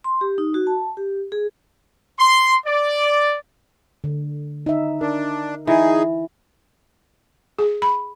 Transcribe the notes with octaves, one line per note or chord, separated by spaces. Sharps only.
C6
G4
D#4
F#4
A5
G4
G#4
C6
D5
D3
D#4 E5
D4 A#4
E3 D#4 G#4
G#4
B5